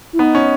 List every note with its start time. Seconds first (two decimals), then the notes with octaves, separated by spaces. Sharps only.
0.13 E4
0.19 B3 D#4
0.35 C#4